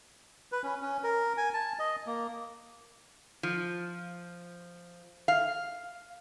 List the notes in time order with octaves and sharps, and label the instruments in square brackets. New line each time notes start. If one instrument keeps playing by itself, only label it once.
[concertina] B4
C#4
C#4
A#4
G#5
A5
D#5
A#3
[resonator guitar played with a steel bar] F3
F5